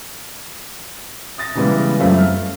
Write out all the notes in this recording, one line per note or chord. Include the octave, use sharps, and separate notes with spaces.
D#6 A6 A#6
C#3 E3 G3 G#3 B3
F#2 G3 A3 C4 F4
F6